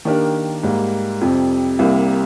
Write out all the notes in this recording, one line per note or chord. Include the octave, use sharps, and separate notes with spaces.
D#3 A#3 D4 G4 A#4
G#2 G3 A#3
F2 C3 G3 C4
C2 C3 G3 A#3